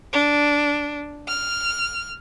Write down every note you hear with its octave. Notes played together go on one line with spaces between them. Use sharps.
D4
F6